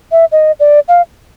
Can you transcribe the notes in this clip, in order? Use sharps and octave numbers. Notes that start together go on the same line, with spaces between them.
E5
D#5
D5
F5